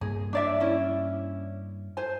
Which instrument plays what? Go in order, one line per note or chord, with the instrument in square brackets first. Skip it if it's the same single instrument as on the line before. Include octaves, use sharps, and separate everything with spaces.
[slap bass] G2 A#3 [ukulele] G#4
[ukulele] D4 D5 E5
C#4 E4
C5 G#5